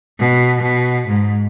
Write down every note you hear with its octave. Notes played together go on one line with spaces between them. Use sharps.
B2
B2
G#2